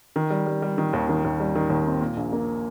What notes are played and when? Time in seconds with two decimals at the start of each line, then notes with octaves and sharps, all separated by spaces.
0.16 D#3
0.30 G3
0.46 G3
0.62 G3
0.78 D#3
0.93 D#2
1.09 D#3
1.24 D#2
1.40 G3
1.55 D#3
1.70 D#2
1.86 C4
2.01 A#2
2.17 A#1
2.32 A#3